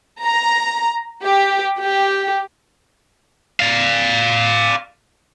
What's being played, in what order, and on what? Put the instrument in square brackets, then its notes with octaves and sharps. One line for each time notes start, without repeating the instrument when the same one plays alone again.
[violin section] A#5
G4
G4
[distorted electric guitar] D5 F5